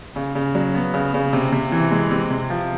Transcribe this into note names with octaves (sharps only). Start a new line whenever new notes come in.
C#3
C#3
F#3
B3
C#3
C#3
C3
C3
E3
G#3
C3
C3
F3